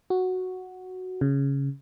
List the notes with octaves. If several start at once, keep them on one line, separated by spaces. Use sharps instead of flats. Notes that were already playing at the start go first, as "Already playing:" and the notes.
F#4
C#3